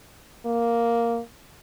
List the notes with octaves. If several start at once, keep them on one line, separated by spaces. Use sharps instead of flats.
A#3